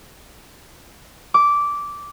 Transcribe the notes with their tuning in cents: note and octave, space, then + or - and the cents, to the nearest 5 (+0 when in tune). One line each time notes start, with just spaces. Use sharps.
D6 -10